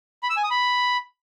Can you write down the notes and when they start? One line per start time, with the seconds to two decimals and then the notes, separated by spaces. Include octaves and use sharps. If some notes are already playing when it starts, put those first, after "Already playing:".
0.23 B5
0.30 E6
0.37 G#5
0.44 D#6
0.51 B5